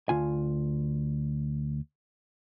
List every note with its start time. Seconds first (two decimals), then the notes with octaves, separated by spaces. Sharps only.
0.09 D2 F4 G#5